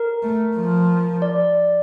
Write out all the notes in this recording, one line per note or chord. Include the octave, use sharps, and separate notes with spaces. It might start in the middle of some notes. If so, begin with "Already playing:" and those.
Already playing: A#4
A3
F3
D5